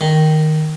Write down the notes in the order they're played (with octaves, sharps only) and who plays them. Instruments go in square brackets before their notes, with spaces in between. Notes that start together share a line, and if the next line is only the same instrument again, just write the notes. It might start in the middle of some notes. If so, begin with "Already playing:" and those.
[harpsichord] D#3